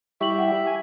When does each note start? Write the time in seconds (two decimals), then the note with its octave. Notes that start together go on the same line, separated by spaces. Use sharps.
0.21 G3 E4 G4 E5 C#6 F#7
0.39 F#5 G5
0.67 G#5